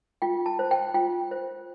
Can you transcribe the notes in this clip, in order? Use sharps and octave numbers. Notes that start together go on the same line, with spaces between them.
F4 G5
A5
C5
G5
F4 G5
C5